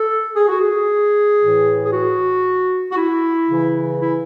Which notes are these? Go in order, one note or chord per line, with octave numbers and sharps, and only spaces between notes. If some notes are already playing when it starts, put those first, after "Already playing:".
Already playing: A4
G#4
F#4
G#4
A2 E3
G#4
F#4
F#4
E4
C#3 E3
E4